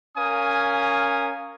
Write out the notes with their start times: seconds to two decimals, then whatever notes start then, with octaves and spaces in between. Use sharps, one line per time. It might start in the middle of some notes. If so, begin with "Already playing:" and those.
0.18 C#4 A#4 F5 G#5 D#6